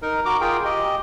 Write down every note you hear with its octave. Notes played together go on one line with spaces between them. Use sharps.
D#4 A#4
F#4 A#5 D6
F4 G#4 A#4 G5
G4 D#5